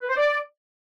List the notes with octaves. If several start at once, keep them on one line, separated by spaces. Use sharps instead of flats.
B4
C5
D5